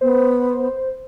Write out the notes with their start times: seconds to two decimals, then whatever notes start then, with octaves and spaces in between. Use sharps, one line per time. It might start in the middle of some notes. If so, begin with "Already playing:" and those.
0.01 B3 C5